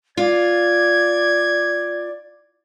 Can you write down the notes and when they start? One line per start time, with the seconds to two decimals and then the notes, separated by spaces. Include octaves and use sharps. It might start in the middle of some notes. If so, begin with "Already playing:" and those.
0.17 F4 D5 G#6